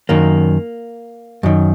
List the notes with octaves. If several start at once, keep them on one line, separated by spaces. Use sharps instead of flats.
F#2 D#3 A#3
F#2 D#3